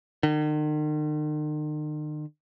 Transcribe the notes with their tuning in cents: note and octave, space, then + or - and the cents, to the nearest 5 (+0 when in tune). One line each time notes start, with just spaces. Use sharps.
D#3 -45